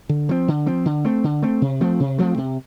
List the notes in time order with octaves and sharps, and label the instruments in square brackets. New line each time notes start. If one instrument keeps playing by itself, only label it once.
[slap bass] D3
F3 C4
D3
F3 C4
D3
A3 C4
D3
A3 C4
C3
F3 A3 C4
C3
F3 A3 C4
C3